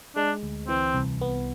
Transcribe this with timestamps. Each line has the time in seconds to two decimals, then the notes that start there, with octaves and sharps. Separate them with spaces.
0.16 G#3 D4
0.43 D2
0.68 E3 C4
0.95 C2
1.21 B3